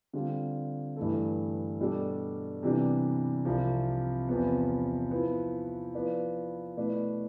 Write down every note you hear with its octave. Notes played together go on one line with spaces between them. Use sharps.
D3 G3 C4 F4
G2 E3 A3 E4 A4
B2 G3 D4 A4
C3 E3 G3 B3 D4
C2 C3 F3
E2 C3 F3 B3
F3 B3 E4 B4
F3 B3 E4 B4 D5
B2 A3 E4 B4 D5